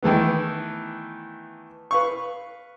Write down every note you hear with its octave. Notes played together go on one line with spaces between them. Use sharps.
D#3 E3 A3 B3
B4 F5 C#6